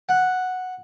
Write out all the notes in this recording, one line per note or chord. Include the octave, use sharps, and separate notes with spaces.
F#5